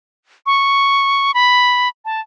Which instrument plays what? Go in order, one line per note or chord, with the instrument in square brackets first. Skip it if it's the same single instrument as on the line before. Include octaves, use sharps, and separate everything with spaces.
[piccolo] C#6
B5
A5